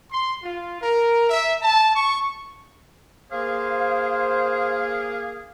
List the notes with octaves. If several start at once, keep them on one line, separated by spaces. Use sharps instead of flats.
C6
F4
A#4
E5
A5
C#6
A#3 G#4 C5 F5